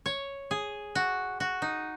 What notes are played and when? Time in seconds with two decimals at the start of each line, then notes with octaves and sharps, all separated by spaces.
0.06 C#5
0.51 G#4
0.95 F#4
1.40 F#4
1.62 D#4